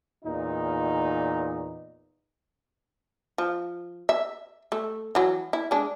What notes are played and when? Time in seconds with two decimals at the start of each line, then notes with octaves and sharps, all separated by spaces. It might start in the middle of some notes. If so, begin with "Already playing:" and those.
0.24 E2 A#2 D#4
3.38 F3
4.09 E5
4.72 A3
5.15 E3 F#3
5.53 E4
5.71 G#3 D4